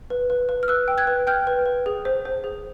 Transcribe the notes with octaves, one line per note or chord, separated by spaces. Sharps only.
B4
B4
B4
F6
B4 E6 F#6
G5
F#6 G#6
B4
G5 F6 G6
B4
B4
G#4
C5
C5
G#4